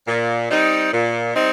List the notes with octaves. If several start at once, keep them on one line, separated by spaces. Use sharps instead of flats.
A#2
G3 C4 D#4
A#2
G3 C4 D#4